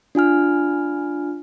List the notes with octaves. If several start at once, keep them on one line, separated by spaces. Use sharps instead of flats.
D4 F4 G#5 F6